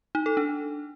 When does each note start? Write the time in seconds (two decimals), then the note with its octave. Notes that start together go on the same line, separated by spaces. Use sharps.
0.15 D#4
0.26 A4
0.37 D4